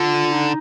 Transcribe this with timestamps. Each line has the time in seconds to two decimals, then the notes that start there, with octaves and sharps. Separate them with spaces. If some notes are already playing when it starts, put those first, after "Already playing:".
Already playing: D3 F4
0.32 D#4